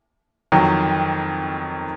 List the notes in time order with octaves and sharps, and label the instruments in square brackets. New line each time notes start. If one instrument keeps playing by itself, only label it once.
[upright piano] F2 D#3 F#3